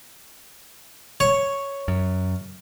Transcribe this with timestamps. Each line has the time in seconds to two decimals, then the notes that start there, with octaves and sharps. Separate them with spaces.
1.20 C#5
1.88 F#2